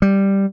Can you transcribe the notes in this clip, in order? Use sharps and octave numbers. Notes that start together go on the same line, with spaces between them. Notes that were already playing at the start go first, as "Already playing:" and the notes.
G3